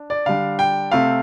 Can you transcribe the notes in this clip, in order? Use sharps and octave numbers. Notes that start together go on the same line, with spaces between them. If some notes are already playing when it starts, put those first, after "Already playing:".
Already playing: D4
D5
D3 G3 D4 F5
G5
C3 A3 C4 F5